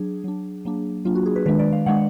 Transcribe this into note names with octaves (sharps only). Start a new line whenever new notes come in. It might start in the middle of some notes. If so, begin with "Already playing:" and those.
Already playing: F#3 D4 G#4
F#3 D4
F#3 A#3 D4
F#3 A#3 D4 F4
F#4
G#4
B4
D#3 G#3 D4 B4
D5
F5
D#3 G#3 D4 F#5